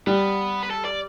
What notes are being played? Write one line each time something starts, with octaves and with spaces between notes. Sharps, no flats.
G3 B3
B4
A4
D5